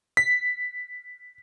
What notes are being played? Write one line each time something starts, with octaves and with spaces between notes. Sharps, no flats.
B6